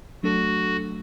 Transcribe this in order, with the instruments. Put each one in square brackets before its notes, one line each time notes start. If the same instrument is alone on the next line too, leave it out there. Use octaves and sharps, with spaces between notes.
[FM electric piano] F#3 A3 D4 A4 [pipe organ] F#4